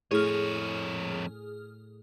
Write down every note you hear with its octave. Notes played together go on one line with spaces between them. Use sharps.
F2 A2 G#4 C#5 F6